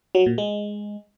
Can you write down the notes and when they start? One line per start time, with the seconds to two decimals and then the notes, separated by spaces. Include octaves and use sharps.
0.15 F#3
0.26 A#2
0.38 G#3